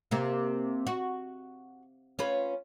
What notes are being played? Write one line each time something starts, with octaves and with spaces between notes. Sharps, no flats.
C3 A#3 C4
F#4
C#4 F4 B4